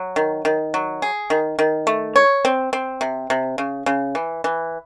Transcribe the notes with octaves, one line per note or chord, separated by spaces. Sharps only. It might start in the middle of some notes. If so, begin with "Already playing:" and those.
Already playing: F#3
D#3
D#3
F#3
G#4
D#3
D#3
A3
C#5
C4
C4
C3
C3
C#3
C#3
E3
E3